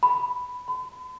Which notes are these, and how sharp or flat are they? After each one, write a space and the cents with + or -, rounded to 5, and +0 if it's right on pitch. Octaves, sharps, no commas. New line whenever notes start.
B5 +5
B5 +45